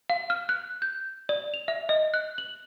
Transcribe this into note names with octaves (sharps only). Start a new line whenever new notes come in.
F5
F6
F#6
G6
D5
F7
E5
D#5
F#6
F#7